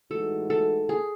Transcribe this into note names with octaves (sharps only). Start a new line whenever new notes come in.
A2 E3 G#3 D#4 F#4 A4
A4
G#4